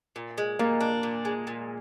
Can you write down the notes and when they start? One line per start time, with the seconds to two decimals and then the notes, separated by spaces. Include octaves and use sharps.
0.16 A#2
0.38 G#3
0.59 A#2 A#3
0.80 D4
1.03 A#2
1.25 G#3
1.47 A#2